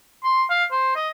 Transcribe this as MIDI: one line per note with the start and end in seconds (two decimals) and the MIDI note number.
0.23 0.44 84
0.50 0.65 77
0.71 0.91 72
0.95 1.09 75